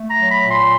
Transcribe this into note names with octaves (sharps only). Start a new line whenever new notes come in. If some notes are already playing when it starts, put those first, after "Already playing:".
Already playing: A3
A#5
F#3
B5
A#2
C6